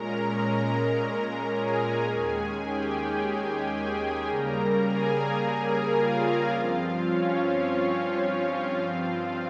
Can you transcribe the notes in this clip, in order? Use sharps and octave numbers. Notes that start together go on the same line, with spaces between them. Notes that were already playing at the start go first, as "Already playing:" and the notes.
Already playing: A#2 G#3 C#4 A#4 A#5
G#4 G#5
D#2 D#3 G#3 C#4
G4 G5
G#4 G#5
C#3 G3 A#3 A#4 A#5
G#4 G#5
G#4 G#5
F4 F5
G2 F3 C4
C#4 C#5
F4 F5
G2 F3 C4